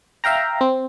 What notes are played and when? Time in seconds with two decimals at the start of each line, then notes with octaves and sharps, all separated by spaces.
0.24 E5 F5 G5 A#5
0.61 C4